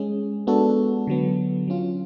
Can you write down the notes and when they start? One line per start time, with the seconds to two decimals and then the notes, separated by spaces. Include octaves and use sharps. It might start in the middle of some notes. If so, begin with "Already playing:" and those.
Already playing: G#3 C#4 G#4
0.47 G#3 B3 D4 F#4 A4
1.07 D3 F#3 B3
1.68 F#3 C#4 F4